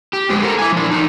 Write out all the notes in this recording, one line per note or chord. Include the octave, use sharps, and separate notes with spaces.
G4
F2 G#3 B4 C5
A4 A#4 F#5 A#5
E4 G#5
F3 D4
E2 D#3 D#4